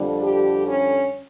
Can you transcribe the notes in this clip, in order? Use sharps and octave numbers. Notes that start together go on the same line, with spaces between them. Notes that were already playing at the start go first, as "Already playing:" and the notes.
Already playing: F2 D3 G3
G4
C#4